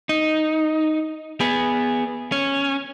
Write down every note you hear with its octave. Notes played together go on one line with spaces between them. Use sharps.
D#4
B3 G#4
C#4